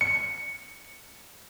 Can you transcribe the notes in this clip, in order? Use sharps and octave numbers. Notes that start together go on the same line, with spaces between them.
C#7